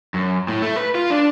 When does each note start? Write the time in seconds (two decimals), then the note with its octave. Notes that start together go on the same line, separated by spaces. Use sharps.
0.14 F#2
0.48 A2
0.62 A3
0.76 B4
0.95 F4
1.10 D4